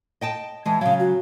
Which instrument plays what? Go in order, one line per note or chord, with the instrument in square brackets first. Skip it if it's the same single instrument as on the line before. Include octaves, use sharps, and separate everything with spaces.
[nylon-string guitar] D#5 G5 A5
[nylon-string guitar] E3 G#3 [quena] A5
[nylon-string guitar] C#3 F#3 [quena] F5
[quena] F#4